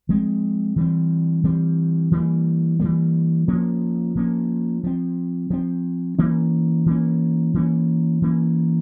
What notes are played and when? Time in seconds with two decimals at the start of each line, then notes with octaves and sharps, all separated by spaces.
0.09 F3 G#3 C4
0.76 E3 G3 C4
1.44 E3 G3 C4
2.12 E3 G3 A#3
2.80 E3 G3 A#3
3.48 F3 A#3 C#4
4.15 F3 A#3 C#4
4.84 F3 C4
5.50 F3 C4
6.19 E3 A#3 C#4
6.86 E3 A#3 C#4
7.54 E3 A#3 C#4
8.22 E3 A#3 C#4